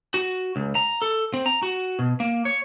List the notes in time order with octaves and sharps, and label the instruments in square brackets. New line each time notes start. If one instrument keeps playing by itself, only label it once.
[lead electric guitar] F#4
C#2
A#5
A4
C4
A#5
F#4
B2
A#3
C#5